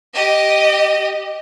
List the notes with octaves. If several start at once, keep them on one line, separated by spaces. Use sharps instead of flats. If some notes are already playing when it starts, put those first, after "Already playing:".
G4 D#5